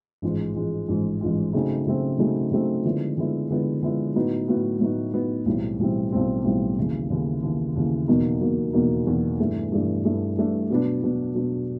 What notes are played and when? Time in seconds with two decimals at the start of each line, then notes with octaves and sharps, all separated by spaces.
0.22 A1 G#2 F3 G#3
0.56 A1 G#2 F3 G#3
0.88 A1 G#2 F3 G#3
1.21 A1 G#2 F3 G#3
1.53 C#3 F#3 A3 C4 D#4
1.87 C#3 F#3 A3 C4 D#4
2.19 C#3 F#3 A3 C4 D#4
2.52 C#3 F#3 A3 C4 D#4
2.85 D3 F3 G#3 B3 E4
3.18 D3 F3 G#3 B3 E4
3.50 D3 F3 G#3 B3 E4
3.83 D3 F3 G#3 B3 E4
4.15 A2 F#3 B3 D#4 F#4
4.48 A2 F#3 B3 D#4 F#4
4.80 A2 F#3 B3 D#4 F#4
5.13 A2 F#3 B3 D#4 F#4
5.46 B1 A2 E3 G3 C4
5.79 B1 A2 E3 G3 C4
6.12 B1 A2 E3 G3 C4
6.45 B1 A2 E3 G3 C4
6.77 D#2 C#3 E3
7.10 D#2 C#3 E3
7.43 D#2 C#3 E3
7.76 D#2 C#3 E3
8.08 E2 B2 F#3 A#3 D#4
8.41 E2 B2 F#3 A#3 D#4
8.73 E2 B2 F#3 A#3 D#4
9.06 E2 B2 F#3 A#3 D#4
9.39 G2 E3 A3 D4
9.72 G2 E3 A3 D4
10.04 G2 E3 A3 D4
10.38 G2 E3 A3 D4
10.70 B2 F#3 B3 D4
11.03 B2 F#3 B3 D4
11.35 B2 F#3 B3 D4